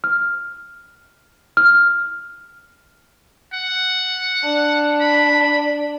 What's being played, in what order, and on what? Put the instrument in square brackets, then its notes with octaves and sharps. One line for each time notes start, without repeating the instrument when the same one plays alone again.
[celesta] F6
F6
[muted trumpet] F#5
[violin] D4
[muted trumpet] B5